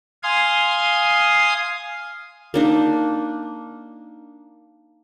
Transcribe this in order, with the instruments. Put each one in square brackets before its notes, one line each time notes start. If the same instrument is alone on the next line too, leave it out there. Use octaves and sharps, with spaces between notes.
[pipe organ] F5 G#5 C6 D#6
[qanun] A#3 D4 D#4